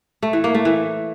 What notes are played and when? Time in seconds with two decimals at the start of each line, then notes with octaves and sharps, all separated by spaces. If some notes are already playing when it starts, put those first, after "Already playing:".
0.22 A3
0.33 E3
0.44 A#3
0.55 A3
0.65 E3